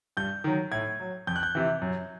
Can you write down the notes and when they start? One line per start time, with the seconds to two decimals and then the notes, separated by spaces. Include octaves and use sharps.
0.17 G2 G6
0.44 D#3 F#3
0.72 A2 G#6
1.00 F#3
1.27 F2 G6
1.36 F#6
1.43 G6
1.55 C3 E3
1.81 F#2